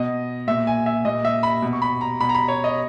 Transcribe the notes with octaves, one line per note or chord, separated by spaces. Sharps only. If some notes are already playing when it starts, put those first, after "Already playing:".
Already playing: B2 D#5
A#2 E5
G#5
E5
A#2 D#5
E5
B5
B2
C#6
B5
A#5
B2 B5
A#5
B5
C#5
D#5